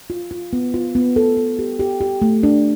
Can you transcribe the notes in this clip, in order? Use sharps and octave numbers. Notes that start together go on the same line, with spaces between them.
F4
F4
B3
F4
B3
A4
A4
G4
G4
G4
A3
D4